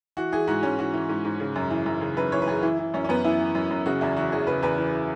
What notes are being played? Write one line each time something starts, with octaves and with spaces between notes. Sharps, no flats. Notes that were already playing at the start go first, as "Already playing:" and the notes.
E3 F#4
E3 G#4
G#2 F#4
G#2 C#4
E3 F#4
E3
G#2
G#2
C#3
F#2
E3
F#2
C#3
F#2 B4
E3 C#5
B4
F#2 G#4
E3 E4
E3
F#2 C#4
C#4
F#2 B3
E3 E4
E3
F#2
F#2
C#3 F#4
E2 E4
E3 F#4
E2 G#4
C#3 B4
E2 B4
E3